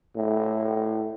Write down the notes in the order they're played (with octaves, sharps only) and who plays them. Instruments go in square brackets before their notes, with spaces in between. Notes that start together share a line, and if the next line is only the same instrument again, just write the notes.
[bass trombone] A2